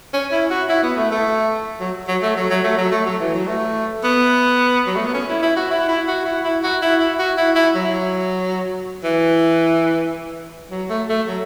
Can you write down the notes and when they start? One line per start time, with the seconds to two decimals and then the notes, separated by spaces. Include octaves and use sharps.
0.14 C#4
0.32 E4
0.50 F#4
0.69 E4
0.83 B3
0.97 A3
1.11 A3
1.80 F#3
2.08 F#3
2.22 A3
2.36 F#3
2.50 F#3
2.64 A3
2.78 F#3
2.92 A3
3.06 F#3
3.20 E3
3.34 F#3
3.47 A3
4.04 B3
4.87 F#3
4.96 A3
5.06 B3
5.14 C#4
5.28 E4
5.42 E4
5.57 F#4
5.71 E4
5.88 E4
6.08 F#4
6.26 E4
6.44 E4
6.63 F#4
6.82 E4
7.00 E4
7.19 F#4
7.37 E4
7.55 E4
7.75 F#3
9.04 E3
10.71 F#3
10.90 A3
11.09 A3
11.28 F#3